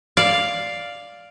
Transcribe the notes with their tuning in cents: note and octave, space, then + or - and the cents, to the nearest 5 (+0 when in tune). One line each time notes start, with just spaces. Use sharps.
D5 +0 F5 +0